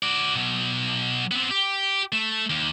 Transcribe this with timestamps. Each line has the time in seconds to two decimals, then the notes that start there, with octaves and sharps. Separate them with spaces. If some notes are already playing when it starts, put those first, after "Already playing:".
0.02 F#4 D5
0.36 B2 F#3
1.31 B3 C4
1.51 G4
2.12 A3
2.50 D#2